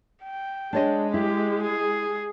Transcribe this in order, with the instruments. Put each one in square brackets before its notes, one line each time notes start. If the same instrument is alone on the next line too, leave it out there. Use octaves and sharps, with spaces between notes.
[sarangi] G5
[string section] G#3 [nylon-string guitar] D4 C#5 D#5
[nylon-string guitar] E4 [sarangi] G4
[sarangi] G#4